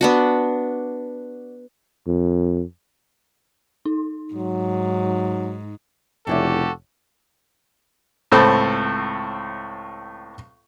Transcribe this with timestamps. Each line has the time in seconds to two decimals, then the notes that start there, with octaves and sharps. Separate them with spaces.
0.01 B3 D4 F#4
2.07 F2
3.85 D#4
4.34 G#2 F#3
6.27 F1 C#3 E4 F#4 G4 A4 D5
8.32 C#2 A2 C4 A4 B5